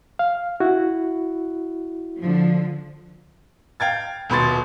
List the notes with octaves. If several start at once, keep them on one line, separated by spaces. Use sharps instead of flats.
F5
E4 F#4
D3 F3
F5 G5 G#6 A6
D#1 B2 B5 C6 A6